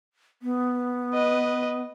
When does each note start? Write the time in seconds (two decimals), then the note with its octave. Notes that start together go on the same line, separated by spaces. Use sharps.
0.42 B3
1.14 B4 D#5